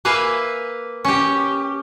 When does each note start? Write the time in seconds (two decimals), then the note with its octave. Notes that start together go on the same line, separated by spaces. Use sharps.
0.05 A#3 B4 E5 F5 G#5
1.05 C#4 G4